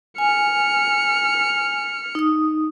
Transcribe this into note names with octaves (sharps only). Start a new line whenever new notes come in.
G#5 F6 C#7
D#4 D#6